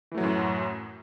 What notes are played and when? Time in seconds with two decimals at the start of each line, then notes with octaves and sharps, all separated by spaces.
0.12 E3
0.15 A3
0.18 F#3
0.21 A2
0.24 F#2